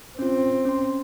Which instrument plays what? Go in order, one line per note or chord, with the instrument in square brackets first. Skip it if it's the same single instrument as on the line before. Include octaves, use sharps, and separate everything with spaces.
[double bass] C4 [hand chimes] C#4 F4
[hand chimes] C#4 C6